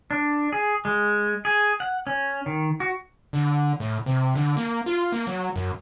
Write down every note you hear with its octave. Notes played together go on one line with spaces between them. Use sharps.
D4
G#4
G#3
G#4
F#5
C#4
D#3
F#4
D3
A2
C3
D3
A#3
F4
A#3
F#3
F#2